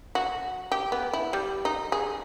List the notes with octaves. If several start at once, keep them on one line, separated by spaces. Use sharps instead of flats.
F#4
G4
B3
E4
G3
D#4
G#4